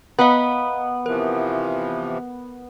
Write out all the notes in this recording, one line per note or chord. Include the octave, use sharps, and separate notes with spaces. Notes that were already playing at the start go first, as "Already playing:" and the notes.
B3 B4 D#5 F5 A#5
C3 E3 F3 A#4